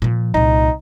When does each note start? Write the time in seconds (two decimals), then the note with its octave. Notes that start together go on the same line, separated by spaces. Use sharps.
0.02 A#2 F3
0.34 C2 A#2 D#4